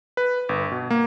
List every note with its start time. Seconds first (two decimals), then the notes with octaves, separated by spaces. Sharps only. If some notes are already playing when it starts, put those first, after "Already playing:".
0.17 B4
0.49 G1
0.71 B2
0.90 A#3